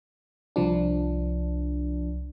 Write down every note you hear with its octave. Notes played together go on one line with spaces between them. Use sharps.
C2 F3 D4